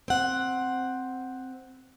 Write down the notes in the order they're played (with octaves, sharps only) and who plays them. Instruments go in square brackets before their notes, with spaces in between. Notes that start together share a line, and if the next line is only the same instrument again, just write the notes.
[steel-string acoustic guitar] C4 F#5